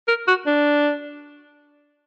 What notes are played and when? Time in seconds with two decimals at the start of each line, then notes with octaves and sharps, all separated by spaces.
0.08 A#4
0.28 F#4
0.46 D4